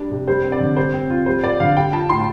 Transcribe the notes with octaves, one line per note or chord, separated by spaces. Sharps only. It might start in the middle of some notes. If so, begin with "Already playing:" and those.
Already playing: G3 D4
C3
G3 C5
C4
D5
D3
G3 C5
C4
F4
G3 C5
F4 D5
D3 F5
G3 G5
F4 A5
A2 C6